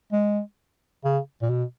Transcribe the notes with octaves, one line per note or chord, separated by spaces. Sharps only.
G#3
C#3
A#2
B2